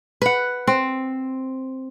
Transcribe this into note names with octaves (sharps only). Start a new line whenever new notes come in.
B4 F#5
C4